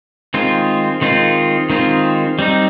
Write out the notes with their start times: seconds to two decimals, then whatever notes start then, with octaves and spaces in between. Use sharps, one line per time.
0.34 D#3 G#3 C4 F4
1.02 D#3 G#3 C4 F4
1.70 D#3 G#3 C4 F4
2.39 G3 C4 D#4